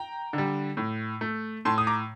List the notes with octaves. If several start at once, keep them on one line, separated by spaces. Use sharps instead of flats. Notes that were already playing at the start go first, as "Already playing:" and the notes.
Already playing: G5 A#5
D3 G3
A2
A3
A2 A5 C6
D#6
A#5 D6